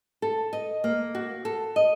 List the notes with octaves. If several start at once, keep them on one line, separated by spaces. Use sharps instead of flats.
A4
D#5
A#3
F#4
A4
D#5